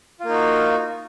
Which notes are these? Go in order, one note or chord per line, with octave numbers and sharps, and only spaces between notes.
A#3 D#4 F4 F#4